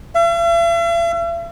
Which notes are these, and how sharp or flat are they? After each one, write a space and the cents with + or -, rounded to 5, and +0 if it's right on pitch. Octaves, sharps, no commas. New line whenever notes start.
E5 +45